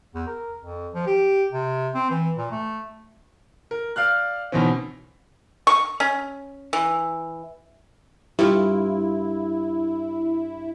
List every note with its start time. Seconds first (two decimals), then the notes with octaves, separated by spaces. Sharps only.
0.14 E2
0.27 A#4
0.58 F2
0.94 F3
1.07 G4
1.52 C3
1.94 C4
2.10 E3
2.37 A#2
2.52 A3
3.71 A#4
3.96 D5 F5 F6 F#6
4.52 B2 D#3 E3 C4 C#4
5.67 C#6
6.00 C#4
6.73 E3
8.39 G2 E4 F4